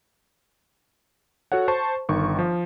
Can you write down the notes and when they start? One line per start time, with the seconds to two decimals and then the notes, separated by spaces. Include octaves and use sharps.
1.52 F#4 A4 C#5 F#5
1.68 C5 A5 C#6
2.09 G1 D#3 C#6
2.39 F3